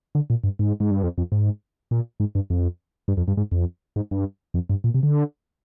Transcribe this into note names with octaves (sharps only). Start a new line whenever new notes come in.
D3
A#2
G2
G#2
G#2
G2
F2
F2
G#2
A#2
G#2
G2
F2
G2
F2
G2
G#2
F2
G#2
G2
F2
G2
A#2
C3
D3